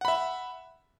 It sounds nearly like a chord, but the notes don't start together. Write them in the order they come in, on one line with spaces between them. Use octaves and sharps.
F#5 B5 E5